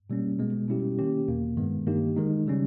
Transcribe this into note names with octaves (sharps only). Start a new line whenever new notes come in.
B2 G3 A#3 C#4
B2 G#3 B3
B2 G3 C#4 E4 G4
D#3 A#3 C#4 G4
E2 B2 A#3
G2 D#3 G#3 B3
G2 D#3 A#3 D#4 G4
D#3 G#3 D#4
C#3 G3 C#4